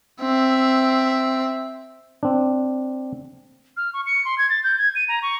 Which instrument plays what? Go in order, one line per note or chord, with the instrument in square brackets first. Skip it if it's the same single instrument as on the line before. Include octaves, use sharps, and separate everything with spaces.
[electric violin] C4 E5
[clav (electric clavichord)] C4 D4
[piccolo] F6
C#6
C#7
C6
G#6
A6
G6
G#6
D#7
A#5
C#6